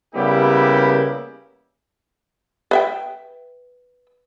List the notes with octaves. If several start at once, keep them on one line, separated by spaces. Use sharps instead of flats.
C#3 G3 A#3 B3 E4 G4
B4 E5 G5